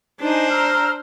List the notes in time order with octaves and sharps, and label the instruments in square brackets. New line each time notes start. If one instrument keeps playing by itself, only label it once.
[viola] D4 C5 [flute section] D#4 G#5
[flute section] A#5 E6 F6